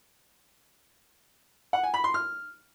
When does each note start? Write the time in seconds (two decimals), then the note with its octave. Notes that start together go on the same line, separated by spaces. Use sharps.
1.73 F#5
1.83 G#5
1.94 B5
2.04 C6
2.14 F6